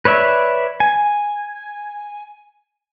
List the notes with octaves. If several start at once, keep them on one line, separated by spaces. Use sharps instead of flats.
B4 C#5 D5 E5
G#5